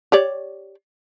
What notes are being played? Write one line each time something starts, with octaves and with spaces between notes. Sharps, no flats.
G4 C#5 D5